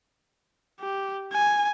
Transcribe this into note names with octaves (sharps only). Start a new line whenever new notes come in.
G4
G#5